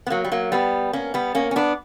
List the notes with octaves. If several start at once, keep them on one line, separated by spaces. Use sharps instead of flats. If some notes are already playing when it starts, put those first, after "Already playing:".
B3
F#3 A#3
G3
F#3 A#3
G3 B3
A#3 C#4
G3 B3
A#3 C#4
C#4
B3 D4